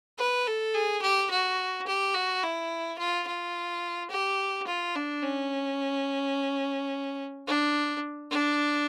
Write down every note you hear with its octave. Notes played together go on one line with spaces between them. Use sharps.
B4
A4
G#4
G4
F#4
G4
F#4
E4
F4
F4
G4
F4
D4
C#4
D4
D4